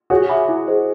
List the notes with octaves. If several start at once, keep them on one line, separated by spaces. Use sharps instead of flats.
F#4 G#4 C#5
E5 G#5 B5 D6
E4
G#4 C5 D#5